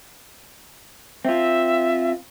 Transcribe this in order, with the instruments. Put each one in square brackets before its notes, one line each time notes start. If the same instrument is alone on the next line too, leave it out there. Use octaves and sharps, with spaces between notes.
[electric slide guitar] C4 F4 [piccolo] E5